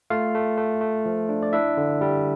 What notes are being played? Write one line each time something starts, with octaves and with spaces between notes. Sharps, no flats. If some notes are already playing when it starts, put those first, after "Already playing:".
A3 F4 F5
A3
A3
A3
F3
D4
D5
D4 E4 E5
D3
G3